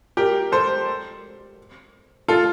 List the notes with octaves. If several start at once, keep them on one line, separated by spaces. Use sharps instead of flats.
G4 A#4
A4 C5
F4 A4